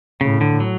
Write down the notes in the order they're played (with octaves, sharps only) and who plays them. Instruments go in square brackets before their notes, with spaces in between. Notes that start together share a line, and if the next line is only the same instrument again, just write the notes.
[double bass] A2 [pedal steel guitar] C#3
[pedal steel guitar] D3
F#3